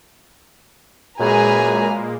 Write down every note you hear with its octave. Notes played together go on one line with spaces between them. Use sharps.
F#2 A#2 G#3 A#3 G#4 B4 G#5 A#5